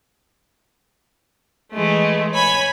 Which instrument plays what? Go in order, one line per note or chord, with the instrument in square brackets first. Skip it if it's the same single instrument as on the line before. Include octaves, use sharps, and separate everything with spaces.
[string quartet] E3 G#3 A3
C#5 G#5 B5 G#6